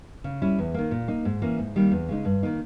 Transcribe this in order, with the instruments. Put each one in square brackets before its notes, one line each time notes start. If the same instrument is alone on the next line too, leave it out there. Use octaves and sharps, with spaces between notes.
[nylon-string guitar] C#3
G3 C#4 E4
E2
D#3 A#3
A#2
A#3 D#4
G#2
E3 A#3 C#4
G#2
D#3 G3 A#3
E2
C#3 G#3 D#4
G2
D#3 A#3 D#4